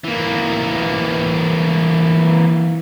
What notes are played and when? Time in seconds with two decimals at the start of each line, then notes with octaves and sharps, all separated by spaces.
0.04 E3 A#3